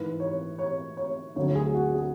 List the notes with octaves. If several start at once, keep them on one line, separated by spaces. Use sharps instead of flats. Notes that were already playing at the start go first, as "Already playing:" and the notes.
Already playing: G#2 E3 B4
C#5
C#5
C#5
D2 D3 F#3 C#5
G#4
F#4
G#4